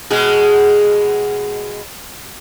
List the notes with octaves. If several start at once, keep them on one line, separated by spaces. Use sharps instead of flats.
B2 G#3 G#4